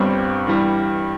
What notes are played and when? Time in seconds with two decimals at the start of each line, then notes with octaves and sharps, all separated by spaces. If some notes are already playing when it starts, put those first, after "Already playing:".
Already playing: G1 G2 G3 C4
0.47 G2 E3 G3